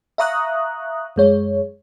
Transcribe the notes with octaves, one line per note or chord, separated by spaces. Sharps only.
E5 F5 A#5 C#6 D#6 F#6
F#2 G#3 C#5